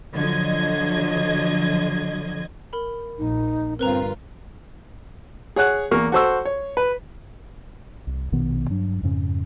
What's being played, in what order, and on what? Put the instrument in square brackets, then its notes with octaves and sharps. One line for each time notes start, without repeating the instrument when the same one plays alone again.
[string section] D3 F3 F#3 D#5 G#6
[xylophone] A#4 B5
[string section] A#1 [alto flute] D#4
[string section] G1 G2 F4 [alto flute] C4 [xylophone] A#4 B4 A#5
[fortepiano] G#4 C#5 F#5 F#6
E2 A#3 C#6 F6
F#4 A4 C5 C#6 E6
C#5
B4
[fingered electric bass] C2
A#1 B2 D#3 B3
G2 F#3 D4
F2 G#2 C#3 C#4